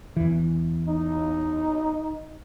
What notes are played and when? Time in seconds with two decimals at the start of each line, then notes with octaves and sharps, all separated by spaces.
0.17 E2 E3
0.89 D#4